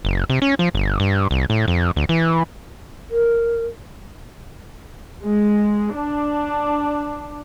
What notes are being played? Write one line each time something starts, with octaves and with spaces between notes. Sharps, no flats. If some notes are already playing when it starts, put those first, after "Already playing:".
F#1
C3
C#4
F3
G1
G2
C2
A2
F2
D2
E3
A#4
G#3
D4